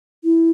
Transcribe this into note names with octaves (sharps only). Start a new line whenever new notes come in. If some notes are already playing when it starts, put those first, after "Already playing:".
E4